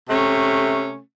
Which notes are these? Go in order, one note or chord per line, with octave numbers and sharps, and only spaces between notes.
C3 A3 C#4